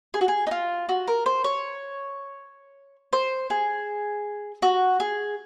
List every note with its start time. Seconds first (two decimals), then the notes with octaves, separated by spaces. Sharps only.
0.14 G#4
0.21 F#4
0.28 G#4
0.47 D#4
0.51 F4
0.89 F#4
1.08 A#4
1.26 C5
1.44 C#5
3.13 C5
3.50 G#4
4.62 F#4
5.00 G#4